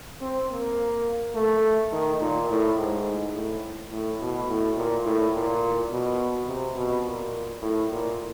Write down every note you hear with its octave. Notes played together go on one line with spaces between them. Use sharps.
C4
A#3
A3
D#3
A#2
A2
G#2
A2
A2
B2
A2
A#2
A2
A#2
B2
C3
B2
A#2
A2
A#2